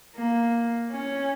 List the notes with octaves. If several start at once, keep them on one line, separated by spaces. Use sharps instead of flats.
A#3
C#4